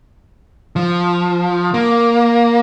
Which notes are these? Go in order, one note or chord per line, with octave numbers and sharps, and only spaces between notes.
F3
A#3